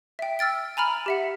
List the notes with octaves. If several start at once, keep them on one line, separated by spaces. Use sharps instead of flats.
E5 G5
E6 F6 A6 D7
G#5 A#5 B5 F6
G4 E5 F#5